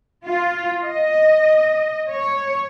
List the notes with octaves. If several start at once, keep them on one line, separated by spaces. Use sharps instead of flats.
F4
D#5
C#5